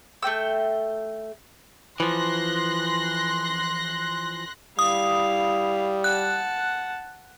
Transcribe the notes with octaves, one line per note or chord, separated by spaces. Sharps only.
A3 A#3 G5 E6
E3 F3 C6 F#6 A#6
G3 E4 F5 D#6
F#5 A5 F#6